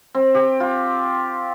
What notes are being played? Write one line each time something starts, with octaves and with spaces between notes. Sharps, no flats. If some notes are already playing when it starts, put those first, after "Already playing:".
C4
G4
F4